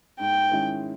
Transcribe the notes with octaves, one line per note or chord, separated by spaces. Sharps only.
G#2 G5
D#3 G#3 C#4 E4